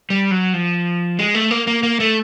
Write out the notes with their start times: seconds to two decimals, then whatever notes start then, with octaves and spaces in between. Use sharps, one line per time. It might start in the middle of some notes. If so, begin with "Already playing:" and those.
0.10 G3
0.31 F#3
0.54 F3
1.19 G#3
1.35 A3
1.51 A#3
1.67 A#3
1.83 A#3
2.00 A3